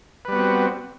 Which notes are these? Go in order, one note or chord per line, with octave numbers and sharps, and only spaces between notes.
G3 B3 C4 F#4 B4